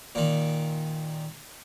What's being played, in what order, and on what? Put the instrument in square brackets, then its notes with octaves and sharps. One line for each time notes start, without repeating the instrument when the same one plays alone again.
[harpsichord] A#2 D#3